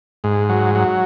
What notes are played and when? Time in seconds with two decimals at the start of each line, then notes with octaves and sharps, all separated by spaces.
0.24 G#2
0.49 F#3
0.75 F#3